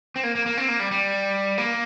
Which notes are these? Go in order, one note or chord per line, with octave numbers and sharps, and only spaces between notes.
C4
A#3
A#3
A#3
C4
A#3
G3
G3
A#3